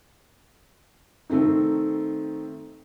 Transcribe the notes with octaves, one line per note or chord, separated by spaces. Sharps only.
D#3 A3 C4 D#4